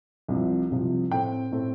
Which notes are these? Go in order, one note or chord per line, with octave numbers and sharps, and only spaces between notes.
C2 C3 F3
C2 C3 F3
A2 A3 C4 G5
A2 A3 C4